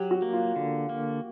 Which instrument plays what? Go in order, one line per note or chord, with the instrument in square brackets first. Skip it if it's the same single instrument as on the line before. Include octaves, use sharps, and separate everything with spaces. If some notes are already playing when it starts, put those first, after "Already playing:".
Already playing: [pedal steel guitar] F#3 [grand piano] G4
[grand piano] F#4
[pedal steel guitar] A#3
[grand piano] F4
[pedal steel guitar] D3
A#3